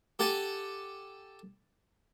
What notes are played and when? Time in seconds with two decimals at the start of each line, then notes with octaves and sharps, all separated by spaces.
0.19 G4 A4 F#5 G#5 A5